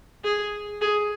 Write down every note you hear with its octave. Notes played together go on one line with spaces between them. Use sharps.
G#4
G#4